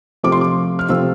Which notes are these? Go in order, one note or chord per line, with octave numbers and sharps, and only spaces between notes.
C3 F3 A3 C4 F4 D6
C6
D6
F6
C3 F3 A3 C4 F4 E6